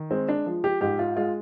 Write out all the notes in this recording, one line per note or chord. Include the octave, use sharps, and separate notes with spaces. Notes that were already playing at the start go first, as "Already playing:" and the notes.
Already playing: D#3
G#3 C4
D4
F3
G4
G#2 G4
F4
G#3 F4